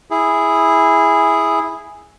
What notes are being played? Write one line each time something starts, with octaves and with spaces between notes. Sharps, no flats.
E4 G#4